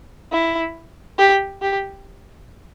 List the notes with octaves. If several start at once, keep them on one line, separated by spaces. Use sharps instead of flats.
E4
G4
G4